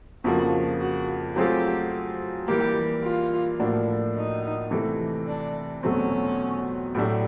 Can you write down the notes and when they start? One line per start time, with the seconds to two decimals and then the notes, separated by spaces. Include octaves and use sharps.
0.24 F2 C#3 F3 A#3 F#4
0.80 F#4
1.36 F#3 A3 C4 F4 G4 G#4
2.48 E3 G3 A#3 G4
3.04 F4
3.59 A2 F3 A#3 D4 F#4
4.15 D#4
4.71 C3 E3 A3
5.27 D4
5.83 E2 B2 F#3 A3 C4 C#4
6.95 A2 F#3 A3 D4 G4